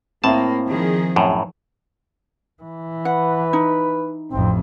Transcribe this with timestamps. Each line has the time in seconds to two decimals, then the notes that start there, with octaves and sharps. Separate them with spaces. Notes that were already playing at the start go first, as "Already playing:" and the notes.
0.24 A2 A#3 C4 E4 A5
0.68 D#3 F3 G#4
1.16 F#2 A2
2.63 E3
3.05 B4 F#5
3.53 D#4
4.32 A1 F2 C4